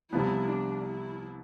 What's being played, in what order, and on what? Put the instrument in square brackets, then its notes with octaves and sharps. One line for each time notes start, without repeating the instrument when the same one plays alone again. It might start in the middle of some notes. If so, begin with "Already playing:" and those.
[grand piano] C2 C3 F3 B3 [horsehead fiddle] E4
[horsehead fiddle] D4
E4